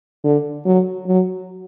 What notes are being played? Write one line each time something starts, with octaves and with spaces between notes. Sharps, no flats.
D3
F#3
F#3